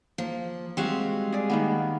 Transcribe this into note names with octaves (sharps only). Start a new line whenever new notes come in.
F3 A#3
G3 G#3 C4 F#4 F5 C#6
G#4 D5
D#3 A#3 B3